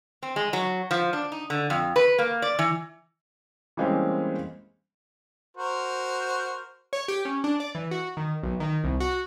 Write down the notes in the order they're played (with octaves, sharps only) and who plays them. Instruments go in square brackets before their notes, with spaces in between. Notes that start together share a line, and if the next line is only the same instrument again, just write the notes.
[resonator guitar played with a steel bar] C4
G#3
F#3
F3
D4
D#4
D3
F2
B4
A#3
D5
E3
[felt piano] E3 G3 G#3 A#3 C4 C#4
[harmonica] F#4 A#4 C5
[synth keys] C#5
G4
C#4
D4
D5
E3
F#4
D#3
B1
D#3
C2
F#4